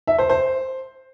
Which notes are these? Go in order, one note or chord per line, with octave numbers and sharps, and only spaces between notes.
E5
C5
C5